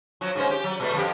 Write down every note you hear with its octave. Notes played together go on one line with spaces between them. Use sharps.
F3 F#3
G#2 C#4 C5
G4
F#3
B2 G3 A3
F2 F3 G4